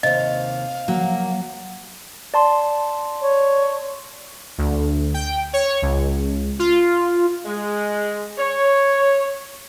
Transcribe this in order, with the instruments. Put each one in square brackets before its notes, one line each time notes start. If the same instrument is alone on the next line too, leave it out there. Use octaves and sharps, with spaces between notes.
[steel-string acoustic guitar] D#2 C3 [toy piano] D#5 [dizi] F5
[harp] F#3 [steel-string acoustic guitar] A#3
[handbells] D5 A5 C6
[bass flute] C#5
[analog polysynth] D2
G5
C#5
C#2
F4
[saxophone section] G#3
C#5